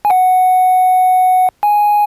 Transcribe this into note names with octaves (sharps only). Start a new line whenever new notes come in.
G#5
F#5
G#5